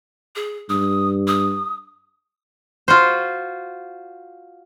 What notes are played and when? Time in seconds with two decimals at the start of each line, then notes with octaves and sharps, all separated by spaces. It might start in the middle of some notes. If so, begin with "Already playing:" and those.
0.36 G#4
0.70 G2 D#6
1.28 D#6
2.88 F4 F#4 C5